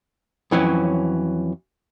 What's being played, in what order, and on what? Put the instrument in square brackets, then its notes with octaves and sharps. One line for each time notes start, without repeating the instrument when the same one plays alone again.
[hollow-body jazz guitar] F2 E3 F#3 C#4